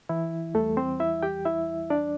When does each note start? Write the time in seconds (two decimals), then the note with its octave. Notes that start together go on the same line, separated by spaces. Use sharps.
0.09 E3 E4
0.55 E2 E3 G3 A3 A4
0.77 C4 C5
1.00 E4 E5
1.23 G4 G5
1.45 E4 E5
1.90 D4 D5